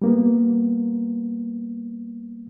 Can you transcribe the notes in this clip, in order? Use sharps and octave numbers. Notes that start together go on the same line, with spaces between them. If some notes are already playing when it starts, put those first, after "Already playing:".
G3 A#3 B3